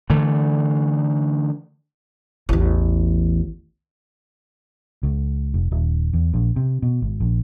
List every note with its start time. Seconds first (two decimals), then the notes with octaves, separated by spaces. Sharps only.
0.10 D3 E3 A3
2.49 A1 E2
5.03 C#2
5.54 F1
5.71 D#1
6.13 E2
6.34 A#1
6.56 C3
6.82 B2
7.02 G#1
7.20 A#1